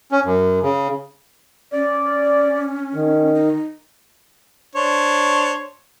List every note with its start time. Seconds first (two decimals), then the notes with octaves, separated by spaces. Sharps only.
0.12 C#4
0.25 F#2
0.63 C#3
1.73 C#4 D5
2.94 D#3
3.35 D#4
4.75 D4 C5 C#5